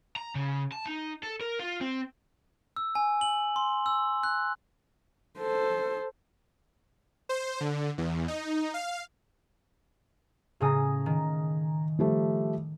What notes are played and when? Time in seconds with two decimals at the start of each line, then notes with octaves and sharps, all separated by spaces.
0.16 A#5
0.35 C#3
0.72 A5
0.86 D#4
1.23 A4
1.41 A#4
1.60 F4
1.81 C4
2.76 E6
2.95 G#5
3.21 F#7
3.56 C6
3.86 E6
4.23 F#6
5.39 A4 C5
7.29 C5
7.61 D3
7.98 E2
8.28 D#4
8.74 F5
10.60 A2 C#3 G#4 G#5 A#5 D#6
11.06 D#3
11.99 F3 G3 A3